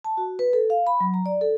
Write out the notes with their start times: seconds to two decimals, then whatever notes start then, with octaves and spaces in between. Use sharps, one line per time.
0.04 A5
0.17 F#4
0.39 B4
0.53 A4
0.70 F5
0.87 B5
1.00 F#3
1.14 A#5
1.26 D5
1.41 A4